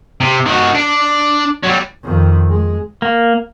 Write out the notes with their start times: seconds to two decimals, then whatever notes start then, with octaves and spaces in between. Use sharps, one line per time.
0.21 C3
0.46 D#3 F#4
0.75 D4
1.64 F#3 G3
2.03 F2 D#3
2.49 G#3
3.02 A#3